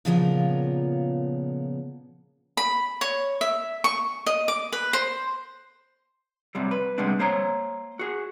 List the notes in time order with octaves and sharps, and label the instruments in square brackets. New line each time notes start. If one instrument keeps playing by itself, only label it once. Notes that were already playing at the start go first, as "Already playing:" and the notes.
[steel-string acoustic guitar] A#2 C#3 F3 B3 F4 A#4
[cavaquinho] B5
C#5
E5
C#6
D#5
D6
B4
C5
[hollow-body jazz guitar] F#2 C3 G3
B4
C3 G3 G#3 B3 D4
A#3 C5 C#5 A#5
F#4 G#4